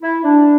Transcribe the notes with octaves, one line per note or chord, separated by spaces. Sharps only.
E4
D4